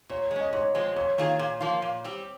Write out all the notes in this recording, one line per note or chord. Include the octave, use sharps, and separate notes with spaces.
A#2 C#5
G#3
C#4 D#5
G#2 C#5
F3 G#3 C4
F2 C#5
D#3 A#3 F4 G#4
A#2
F3 A#3 F4
A#2
G3 C4 G4